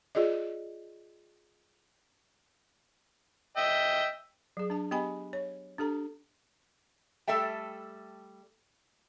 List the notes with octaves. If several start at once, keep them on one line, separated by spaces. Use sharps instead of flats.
F4 G#4 D5 D#5
D#5 E5 G5
F#3 G#4
D4 A5
B3 G4 D#5 G5 G#5 B5
C#5
D4 G4 A4 A#5
G3 A3 A4 E5 G5